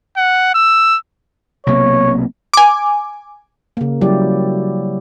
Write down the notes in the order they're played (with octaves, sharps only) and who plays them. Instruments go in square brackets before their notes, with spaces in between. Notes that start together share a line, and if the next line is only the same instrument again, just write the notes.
[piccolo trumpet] F#5
E6
[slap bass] B1 C3 A#3 [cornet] C#5
[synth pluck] G#5 D6
[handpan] C#3 A#3
F#3 G3 E4 G4 D5